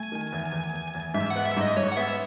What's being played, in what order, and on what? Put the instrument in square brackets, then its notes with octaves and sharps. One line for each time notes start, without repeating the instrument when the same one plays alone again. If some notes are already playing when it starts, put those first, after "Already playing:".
Already playing: [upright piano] A3 [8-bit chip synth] G#5
[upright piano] D#3
E2
E2
E2
E2
[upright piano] G#2 [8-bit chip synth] E5
[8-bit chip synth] F#5
[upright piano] B3
[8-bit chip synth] E5
[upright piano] G#2 [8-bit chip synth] D#5
[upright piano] G#2 [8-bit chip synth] C#5
[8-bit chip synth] F#5
[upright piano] B3 [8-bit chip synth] E5